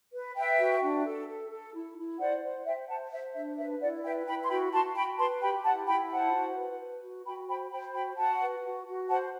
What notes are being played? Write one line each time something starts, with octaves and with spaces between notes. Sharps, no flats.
B4
B4 E5 G5
F#4
D4
A4
A4
A4
E4
E4
C5 D5 F#5
C5
C5 E5 G5
C5 F#5 A5
C5 E5
D4 E5
B4 E5
E4 D5 F#5
B4 E5 G5
E4 G5 B5
C6
F#4 G5 B5
F#4 A5 C6
F#4 G5 B5
B4 A5 C6
G4 G5 B5
E4 F#5 A5
E4 G5 B5
C5 F#5 A5
F#4
B4
B4
F#4
F#4 G5 B5
C5 G5 B5
C5 G5 B5
F#4 G5 B5
F#4 F#5 A5
B4
F#4
F#4
C5 F#5 A5